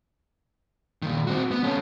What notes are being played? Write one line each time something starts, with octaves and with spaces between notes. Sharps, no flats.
A#2 D#3
C4 F#4
B3
C#4 A4